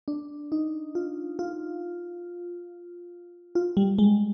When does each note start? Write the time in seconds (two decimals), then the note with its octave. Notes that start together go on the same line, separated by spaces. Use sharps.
0.08 D4
0.52 D#4
0.95 F4
1.39 F4
3.55 F4
3.77 G3
3.98 G#3